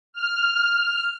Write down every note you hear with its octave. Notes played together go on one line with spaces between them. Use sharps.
F6